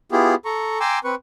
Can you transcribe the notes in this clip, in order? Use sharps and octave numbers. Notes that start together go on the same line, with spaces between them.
B3 E4 F4 G4 G#4
A4 A#5 C#6
G5 G#5 A#5 C6 D6 E6
C4 B4 C#6